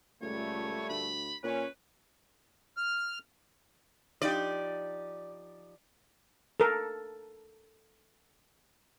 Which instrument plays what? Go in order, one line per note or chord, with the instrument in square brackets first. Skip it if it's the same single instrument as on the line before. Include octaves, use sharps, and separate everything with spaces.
[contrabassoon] C#2 [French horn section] A#2 G3 A3 [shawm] C#5
[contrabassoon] D2 [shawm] B5
[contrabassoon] A#2 [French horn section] C#4 [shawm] B4
[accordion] F6
[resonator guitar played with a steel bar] F3 D#4 G4 [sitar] D5
[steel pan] A4 A#4